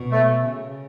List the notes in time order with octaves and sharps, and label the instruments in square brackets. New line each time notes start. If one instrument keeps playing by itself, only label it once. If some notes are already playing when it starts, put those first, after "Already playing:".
Already playing: [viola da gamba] B2
[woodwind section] A3
[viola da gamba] C#3